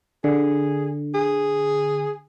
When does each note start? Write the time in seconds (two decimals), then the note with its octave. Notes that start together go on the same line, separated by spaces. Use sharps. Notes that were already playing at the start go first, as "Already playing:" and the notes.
0.24 D3 G#4
1.14 G#4